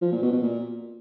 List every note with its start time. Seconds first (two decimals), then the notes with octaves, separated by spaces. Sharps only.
0.02 F3
0.12 A#2
0.22 B2
0.32 B2
0.43 A#2